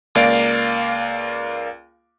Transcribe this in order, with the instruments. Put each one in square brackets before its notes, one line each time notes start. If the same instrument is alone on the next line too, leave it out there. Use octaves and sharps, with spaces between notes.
[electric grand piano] C#2 A#3 D5 F5 D7